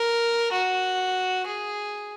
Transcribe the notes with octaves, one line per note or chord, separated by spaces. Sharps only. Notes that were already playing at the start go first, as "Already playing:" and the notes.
Already playing: A#4
F#4
G#4